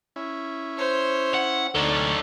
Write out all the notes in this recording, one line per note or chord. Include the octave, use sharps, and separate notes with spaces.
C#4 E4
C5 C#5
F#5
D2 D#4 A4 C#5 D5